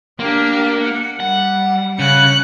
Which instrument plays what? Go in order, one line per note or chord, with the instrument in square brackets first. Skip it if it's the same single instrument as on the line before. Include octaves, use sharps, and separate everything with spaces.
[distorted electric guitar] A#3 [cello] D4 G4
[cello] F#5
[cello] G3 [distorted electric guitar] F#5
[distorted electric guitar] C#3 [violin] F#6 C#7